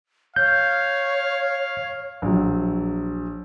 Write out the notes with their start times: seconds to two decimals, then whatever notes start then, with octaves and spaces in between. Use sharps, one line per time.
0.36 C#5 F5 G6
2.22 A#1 F#3